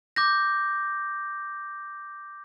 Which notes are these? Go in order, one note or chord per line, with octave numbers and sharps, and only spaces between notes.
D6 G6 A#6